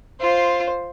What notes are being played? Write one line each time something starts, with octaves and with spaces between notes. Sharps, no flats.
F4 C5